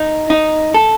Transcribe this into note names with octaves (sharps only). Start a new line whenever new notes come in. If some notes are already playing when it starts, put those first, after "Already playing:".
Already playing: D#4
D#4
A4